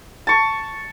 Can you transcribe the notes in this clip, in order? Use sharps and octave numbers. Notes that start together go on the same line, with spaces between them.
A5 C#6